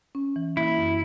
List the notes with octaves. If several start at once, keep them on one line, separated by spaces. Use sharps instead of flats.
C#4
E3
A#3 E4
F#2